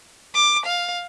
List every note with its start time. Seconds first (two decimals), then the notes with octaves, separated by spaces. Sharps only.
0.35 D6
0.66 F5